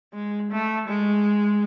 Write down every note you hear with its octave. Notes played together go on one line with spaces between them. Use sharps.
G#3
A3
G#3